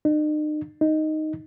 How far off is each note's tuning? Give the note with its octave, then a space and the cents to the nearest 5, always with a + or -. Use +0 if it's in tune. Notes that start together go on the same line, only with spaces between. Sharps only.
D#4 -40
D#4 +0